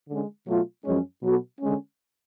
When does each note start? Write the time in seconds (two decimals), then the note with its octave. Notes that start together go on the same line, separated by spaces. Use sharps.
0.08 D3 G#3 C#4
0.47 B2 F#3 A3 F4
0.84 F#2 F3 G#3 C#4
1.22 B2 F#3 B3 F#4 A4
1.60 D3 G#3 C#4